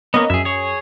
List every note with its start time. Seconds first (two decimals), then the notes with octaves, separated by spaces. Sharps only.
0.14 A#3 B3 C#4 A#4 D#5
0.30 F#2 G#4 E5
0.45 G#4 C#5